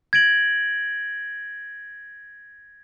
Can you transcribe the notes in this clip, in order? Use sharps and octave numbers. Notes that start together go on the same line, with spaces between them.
G#6 A#6 D7 F#7